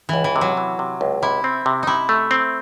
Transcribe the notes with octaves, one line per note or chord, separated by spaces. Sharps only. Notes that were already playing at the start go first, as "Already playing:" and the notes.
C#2 E3
E3
C3
F#3
E3
C3
C#2
C3 E4
C4
C3
C3 D#4 E4
A3
C4